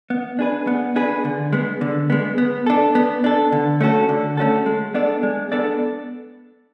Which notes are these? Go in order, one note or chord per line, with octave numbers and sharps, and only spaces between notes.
B3
D4 G#4 B4
B3
D4 G#4 B4
D3
G#3 B3
D3
G#3 B3
B3
D4 A4
B3
D4 A4
D3
A3 C#4 F#4 A4
D3
A3 C#4 F#4 A4
G#3
B3 D4 A4 D5
G#3
B3 D4 A4 D5